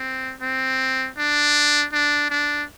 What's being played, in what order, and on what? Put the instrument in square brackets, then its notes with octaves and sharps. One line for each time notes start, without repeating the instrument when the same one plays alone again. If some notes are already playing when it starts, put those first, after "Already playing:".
Already playing: [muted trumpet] C4
C4
D4
D4
D4